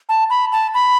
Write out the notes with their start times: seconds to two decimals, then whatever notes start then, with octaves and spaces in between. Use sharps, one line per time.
0.09 A5
0.30 B5
0.52 A5
0.74 B5